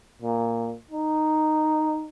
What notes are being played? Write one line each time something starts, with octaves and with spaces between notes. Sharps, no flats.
A#2
D#4